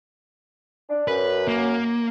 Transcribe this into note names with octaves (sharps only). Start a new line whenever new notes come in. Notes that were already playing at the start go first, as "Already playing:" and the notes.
D4
F#2 B4
A#3